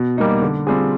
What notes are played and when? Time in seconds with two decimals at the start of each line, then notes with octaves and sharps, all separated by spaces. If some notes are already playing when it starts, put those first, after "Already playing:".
Already playing: B2
0.17 G3 A#3 D#4 F#4
0.42 D3
0.67 G3 C4 F4 G#4